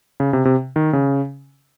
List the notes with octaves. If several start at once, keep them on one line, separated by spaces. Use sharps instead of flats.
C#3
C3
C3
D#3
C#3